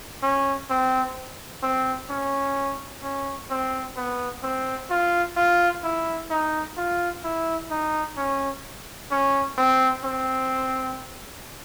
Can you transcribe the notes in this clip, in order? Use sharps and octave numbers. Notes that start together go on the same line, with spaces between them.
C#4
C4
C4
C#4
C#4
C4
B3
C4
F4
F4
E4
D#4
F4
E4
D#4
C#4
C#4
C4
C4